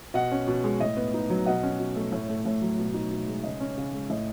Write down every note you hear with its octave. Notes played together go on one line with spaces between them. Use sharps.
B2 D#5 F#5
C#4
B2
G#3
A2 D#5
B3
D#4
F#3
B2 D#5 F#5
C#4
B2
A3
A2 C#5
A3
A2
F#3
B2
D#4
B2
G#3
C#3 D#5
C#4
C#3
G#3
A2 D#5